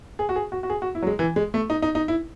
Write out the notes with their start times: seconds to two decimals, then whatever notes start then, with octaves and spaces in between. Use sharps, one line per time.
0.19 G#4
0.29 F#4
0.36 G#4
0.52 F#4
0.63 F#4
0.70 G#4
0.82 F#4
0.95 E4
1.02 F#3
1.07 G#3
1.19 E3
1.36 G#3
1.54 A3
1.70 D#4
1.82 D#4
1.95 D#4
2.08 E4